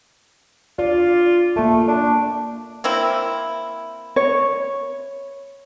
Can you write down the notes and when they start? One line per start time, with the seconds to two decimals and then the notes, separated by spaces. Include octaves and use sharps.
0.79 F4 D5
1.56 A3 A#3 F4
1.88 D4
2.84 A#3 C4 E4
4.16 C#5